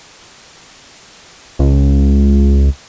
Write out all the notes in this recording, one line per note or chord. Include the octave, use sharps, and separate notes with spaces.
C#2